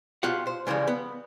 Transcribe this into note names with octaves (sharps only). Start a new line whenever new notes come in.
B2 B3 F4 G4 F5 F#5
C5
C#3 E3 F3 G3 G#3
B3